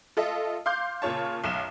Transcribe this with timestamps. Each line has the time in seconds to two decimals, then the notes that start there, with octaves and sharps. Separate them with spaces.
0.17 F4 A4 D#5 E5
0.66 F5 C6 D6 G6
1.02 A#2 C#3 F4 C#5 A5
1.44 B1 F#2 E7